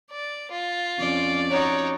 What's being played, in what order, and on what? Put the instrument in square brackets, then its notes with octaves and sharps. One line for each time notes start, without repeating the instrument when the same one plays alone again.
[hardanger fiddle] D5
F4
[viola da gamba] F2 C#4 D5
[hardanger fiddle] D#4 F#4 [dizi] C#5